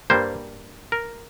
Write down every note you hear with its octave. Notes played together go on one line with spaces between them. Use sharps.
G2 G3 A#3 C5
A#4